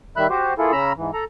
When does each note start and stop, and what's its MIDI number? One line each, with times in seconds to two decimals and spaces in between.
0.17 0.27 51
0.17 0.27 55
0.17 0.27 76
0.17 0.27 83
0.17 0.27 90
0.30 0.54 66
0.30 0.54 67
0.30 0.54 72
0.58 0.72 58
0.58 0.72 64
0.58 0.72 65
0.58 0.72 68
0.58 0.72 69
0.72 0.92 49
0.72 0.92 61
0.72 0.92 82
0.72 0.92 83
0.72 0.92 88
0.96 1.11 44
0.96 1.11 52
1.13 1.24 69
1.13 1.24 82